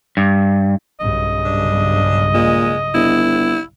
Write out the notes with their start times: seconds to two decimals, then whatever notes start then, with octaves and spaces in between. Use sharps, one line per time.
0.17 G2
1.00 B1 G2 C#3 D#5
1.45 D4
2.34 A#2 G#3
2.94 G1 E4